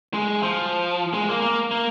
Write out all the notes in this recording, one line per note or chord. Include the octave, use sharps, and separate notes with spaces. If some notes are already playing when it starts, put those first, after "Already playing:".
G#3
F3
G#3
A#3
A#3
A#3